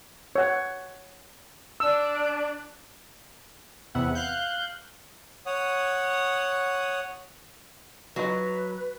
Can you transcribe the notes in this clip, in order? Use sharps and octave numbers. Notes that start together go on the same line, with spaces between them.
C#5 F#5
D4 E6
E2 C3 B3 E5 F#5
F5 F#6 G6
C#5 F#5 D#6
F#3 D#4 F4 A#4 B4